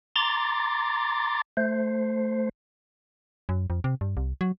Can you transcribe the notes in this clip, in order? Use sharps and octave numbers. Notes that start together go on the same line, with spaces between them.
A#5 C6 D6 A6
A3 C5
F#2
F2
C3
G2
C2
F#3